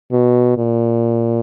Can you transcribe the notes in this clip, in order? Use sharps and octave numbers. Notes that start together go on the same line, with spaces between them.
B2
A#2